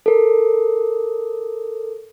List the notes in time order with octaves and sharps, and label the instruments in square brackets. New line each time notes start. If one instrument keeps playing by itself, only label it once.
[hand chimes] A4 A#4